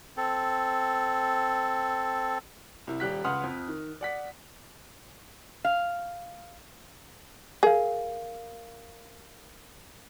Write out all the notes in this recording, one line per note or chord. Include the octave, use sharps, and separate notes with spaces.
C4 A4
C2 E4
D#1 G3 G4 F#6 B6
C#2 B4 F#5 C6 D#6 F6
F2
D#3
D5 F#5 B6
F5
G#4 A#4 F5